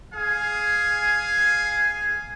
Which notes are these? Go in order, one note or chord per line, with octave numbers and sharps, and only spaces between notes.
G#4 F5 G#5